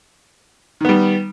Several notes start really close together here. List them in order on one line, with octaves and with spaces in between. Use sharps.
D#3 B3 G3